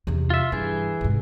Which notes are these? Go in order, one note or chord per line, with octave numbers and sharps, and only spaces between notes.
E2 C3
F4 E5
G2 E3 G#4
G#2 C3